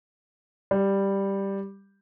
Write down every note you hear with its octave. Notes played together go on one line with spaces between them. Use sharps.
G3